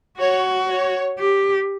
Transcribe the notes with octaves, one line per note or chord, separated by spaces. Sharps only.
F#4 C#5
C#5
G4